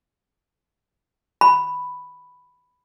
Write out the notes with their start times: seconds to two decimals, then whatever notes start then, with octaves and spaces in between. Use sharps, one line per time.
1.41 B5